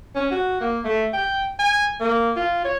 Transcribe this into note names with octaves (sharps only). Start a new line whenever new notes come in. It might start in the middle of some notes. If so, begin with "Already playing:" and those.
C#4
F#4
A#3
A3
G5
G#5
A#3
F4
C#5